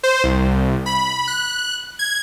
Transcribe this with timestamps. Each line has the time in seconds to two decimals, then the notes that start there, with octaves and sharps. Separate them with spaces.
0.03 C5
0.24 C2
0.86 B5
1.28 F#6
1.99 G#6